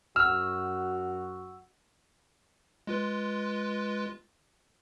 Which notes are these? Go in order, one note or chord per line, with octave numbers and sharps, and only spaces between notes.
F#2 F#4 E6 F6
G#3 F4 B4